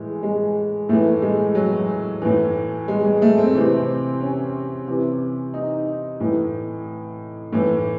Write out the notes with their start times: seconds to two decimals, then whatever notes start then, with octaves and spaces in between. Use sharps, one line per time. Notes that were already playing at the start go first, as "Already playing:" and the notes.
Already playing: A2 E3 G#3
0.23 G#3
0.89 A2 E3 A3
1.22 G#3
1.55 F#3
2.22 A2 E3
2.88 G#3
3.05 G#3
3.22 A3
3.38 C4
3.55 C3 E3 C4
4.21 C#4
4.87 C3 E3
5.54 D#4
6.20 A2 E3
7.52 A2 E3